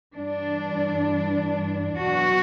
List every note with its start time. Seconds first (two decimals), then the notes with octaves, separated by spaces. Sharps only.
0.14 G2 E3 D4
1.98 E2 B2 F#3 F#4